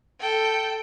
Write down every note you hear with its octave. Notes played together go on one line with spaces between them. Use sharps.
A4 G5